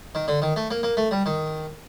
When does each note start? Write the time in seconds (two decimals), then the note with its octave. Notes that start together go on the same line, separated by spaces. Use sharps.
0.15 D#3
0.28 D3
0.42 D#3
0.56 A3
0.71 A#3
0.83 A#3
0.97 A3
1.11 G3
1.26 D#3